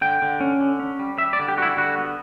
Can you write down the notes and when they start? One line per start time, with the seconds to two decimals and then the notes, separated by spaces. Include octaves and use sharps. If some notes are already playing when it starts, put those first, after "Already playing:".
0.01 D3 G5
0.22 D3
0.40 C#4
0.61 D3
0.79 C#4
0.99 G3
1.18 G3 E5
1.33 D5
1.39 D3
1.48 G4
1.58 G3 F#4
1.62 E4
1.77 D3 F#4
1.98 B3